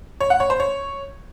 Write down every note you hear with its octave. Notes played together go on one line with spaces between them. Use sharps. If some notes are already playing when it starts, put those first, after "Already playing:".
C#5
F#5
C#5
C5
C#5